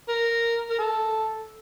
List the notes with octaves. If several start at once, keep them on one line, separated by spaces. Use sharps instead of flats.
A#4
A#4
A4